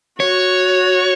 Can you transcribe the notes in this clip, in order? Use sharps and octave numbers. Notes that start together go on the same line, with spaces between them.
F#4 C#5